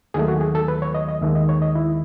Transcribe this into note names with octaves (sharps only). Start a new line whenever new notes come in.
D#2 D#3 F#3 A3 G#4
F#4
G#4
A4
B4
C#5
D#5
D#5
D#2 D#3 G#3 E5
D#5
C#5
D#5
E4